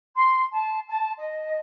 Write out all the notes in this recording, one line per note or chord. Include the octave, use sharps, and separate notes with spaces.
C6
A5
A5
D#5